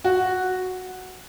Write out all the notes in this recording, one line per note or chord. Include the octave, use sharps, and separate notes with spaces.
F#4